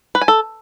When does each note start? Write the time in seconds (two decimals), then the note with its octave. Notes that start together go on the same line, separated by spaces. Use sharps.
0.15 B4
0.21 G#5
0.28 A4